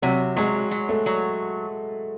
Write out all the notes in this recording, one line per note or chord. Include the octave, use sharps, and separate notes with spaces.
C3 F#3
F#3 G#3
F#3
A3
F#3